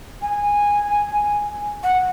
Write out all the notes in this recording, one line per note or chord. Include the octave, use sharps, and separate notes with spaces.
G#5
F#5